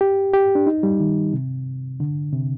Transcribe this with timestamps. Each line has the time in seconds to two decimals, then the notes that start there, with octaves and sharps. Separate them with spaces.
0.01 G4
0.34 G4
0.55 D4
0.67 D#4
0.83 G3
1.00 D#3
1.33 C3
2.00 D3
2.32 C3